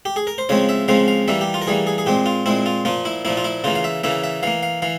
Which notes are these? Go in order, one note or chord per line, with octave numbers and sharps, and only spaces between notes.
G4
G#4
A#4
C5
C#3 F3 G#3 C4 C#5
E5
C#3 F3 G#3 C4 F5
F5
E3 G3 A#3 E5
G4
F4
A#4
E3 G3 A#3 G#4
G#4
G#4
A#2 G#3 C4 G4
F4
A#2 G#3 C4 E4
F4
A#2 F3 A#3 F4
E4
A#2 F3 A#3 E4
F4
E4
C#3 E3 A#3 F4
F5
E5
C#3 E3 A#3 E5
E5
E3 A#3 F5
F5
E3 F5